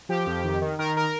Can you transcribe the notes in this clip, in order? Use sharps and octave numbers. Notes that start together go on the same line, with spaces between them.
F3 G4
F2
D#3
D#3
D#3 A#4
A#4